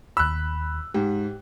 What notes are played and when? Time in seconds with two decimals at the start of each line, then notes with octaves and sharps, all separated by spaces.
0.17 D#2 B5 E6 F#6
0.94 G#2 G4